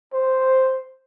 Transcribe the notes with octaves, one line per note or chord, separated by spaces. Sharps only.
C5